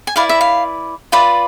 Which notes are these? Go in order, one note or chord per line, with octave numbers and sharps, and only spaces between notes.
G#5
E4 B4 D5 F5
E5
F5
F4 B4 D5 E5